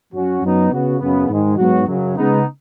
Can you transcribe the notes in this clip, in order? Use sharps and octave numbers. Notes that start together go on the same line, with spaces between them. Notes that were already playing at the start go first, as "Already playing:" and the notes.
F#2 F#3 C#4 F#4
F#2 F#3 B3 D#4
C#3 B3 F#4
F#2 C#3 B3
G#2 D#3 G#3
G#2 F#3 B3 F#4
F#2 C#3 F#3
C#3 G#3 B3 D#4